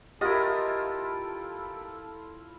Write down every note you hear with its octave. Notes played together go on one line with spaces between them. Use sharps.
E4 F4 G4 A4 A#4 D#5